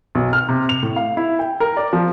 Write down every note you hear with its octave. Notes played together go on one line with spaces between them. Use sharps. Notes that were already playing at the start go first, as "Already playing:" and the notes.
B1
F6
C3
F7
A2
F5
E4
G5
A#4
D5
F3